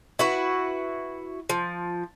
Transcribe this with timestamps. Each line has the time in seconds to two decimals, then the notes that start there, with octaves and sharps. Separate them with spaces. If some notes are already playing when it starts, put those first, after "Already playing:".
0.19 E4 F#4 B4
1.49 F3